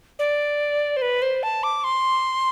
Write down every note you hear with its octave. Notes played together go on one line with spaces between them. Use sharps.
D5
C5
B4
C5
A5
D6
C6